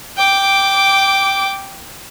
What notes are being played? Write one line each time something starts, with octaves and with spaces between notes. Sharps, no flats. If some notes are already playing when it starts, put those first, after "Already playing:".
G5 D6